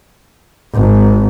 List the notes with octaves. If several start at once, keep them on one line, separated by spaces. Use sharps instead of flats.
G#1